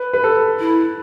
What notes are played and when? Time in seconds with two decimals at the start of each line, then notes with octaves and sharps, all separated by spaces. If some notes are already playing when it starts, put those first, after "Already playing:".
Already playing: B4
0.13 B4
0.24 A4
0.59 E4